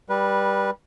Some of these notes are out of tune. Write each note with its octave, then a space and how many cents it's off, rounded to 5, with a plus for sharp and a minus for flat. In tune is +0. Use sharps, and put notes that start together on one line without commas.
G3 +10 B4 -20